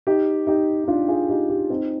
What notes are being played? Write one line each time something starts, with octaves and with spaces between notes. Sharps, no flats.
D#4 G4
D#4 G4
D#4
D4 F4
F4 G#4
D#4 G4
D#4 G4
C4 D#4